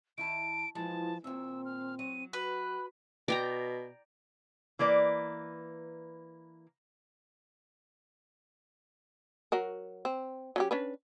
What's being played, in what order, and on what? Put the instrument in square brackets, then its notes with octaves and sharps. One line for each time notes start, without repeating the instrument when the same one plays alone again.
[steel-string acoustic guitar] D#3 E4 A5 [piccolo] D7
[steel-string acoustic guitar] E3 G#3 [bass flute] F3 [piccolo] A5
[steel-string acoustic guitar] D#2 A#2 [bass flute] C4 [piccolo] E6
[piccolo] F6
[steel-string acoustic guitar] F#3 [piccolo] D#7
[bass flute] F#4 [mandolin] B4 [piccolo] F#6
[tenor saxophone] B2 [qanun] D5 G5 A#5
[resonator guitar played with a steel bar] E3 A#3 B4 D5
[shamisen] F#3 F#4 A#4
C4
F#3 C#4 G4
C#4 D4 B4